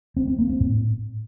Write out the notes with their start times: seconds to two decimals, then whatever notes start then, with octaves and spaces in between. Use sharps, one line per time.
0.17 C4
0.27 C4
0.38 A#3
0.49 C4
0.60 A2